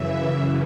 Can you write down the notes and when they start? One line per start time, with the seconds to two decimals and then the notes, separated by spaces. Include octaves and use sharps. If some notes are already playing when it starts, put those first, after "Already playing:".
Already playing: F#2 C#3 E3 E5